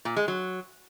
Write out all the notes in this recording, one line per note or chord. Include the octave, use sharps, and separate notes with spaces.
A#2
G#3
F#3